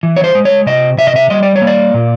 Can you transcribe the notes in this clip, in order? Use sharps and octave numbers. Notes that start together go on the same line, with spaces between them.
E3
C#5
C5
G#3
C#5
C3 D#5
C3 E5
D#5
E5
G3 D#5
D5
C#5
A#3
D5
A#2